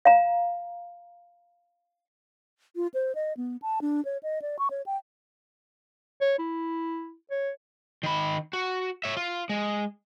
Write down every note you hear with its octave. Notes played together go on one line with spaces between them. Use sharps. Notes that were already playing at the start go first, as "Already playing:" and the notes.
F5 A#5
F4
C5
D#5
B3
A5
D4
C#5
D#5
D5
C#6
C#5
G5
C#5
E4
C#5
D#3 B5
F#4
C#5 E5
F4
G#3